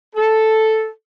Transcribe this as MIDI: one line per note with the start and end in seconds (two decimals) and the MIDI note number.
0.16 0.89 69